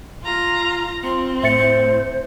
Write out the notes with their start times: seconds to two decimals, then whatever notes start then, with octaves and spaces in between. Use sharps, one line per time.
0.22 F4 A#5
1.03 C4 F4
1.43 A2 C5 E5 A6 C#7